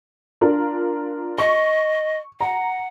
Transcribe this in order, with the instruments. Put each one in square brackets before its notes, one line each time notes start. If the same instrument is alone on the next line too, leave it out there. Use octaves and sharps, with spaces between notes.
[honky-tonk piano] D4 F4 A#4
[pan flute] D#5 [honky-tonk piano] C#6
[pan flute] F#5 [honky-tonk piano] A#5